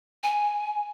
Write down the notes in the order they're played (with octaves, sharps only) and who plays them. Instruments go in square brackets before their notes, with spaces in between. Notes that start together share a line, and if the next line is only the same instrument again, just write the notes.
[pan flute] G#5